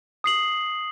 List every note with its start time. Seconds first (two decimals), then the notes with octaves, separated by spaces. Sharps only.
0.24 D#6 C7 F#7